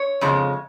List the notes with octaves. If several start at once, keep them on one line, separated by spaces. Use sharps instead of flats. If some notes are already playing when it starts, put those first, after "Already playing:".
Already playing: C#5
F2 C#3 G#3